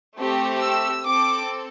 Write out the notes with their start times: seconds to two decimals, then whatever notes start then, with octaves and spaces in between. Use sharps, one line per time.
0.18 A3 C4 G4
0.62 E6
1.05 C4 A4 D6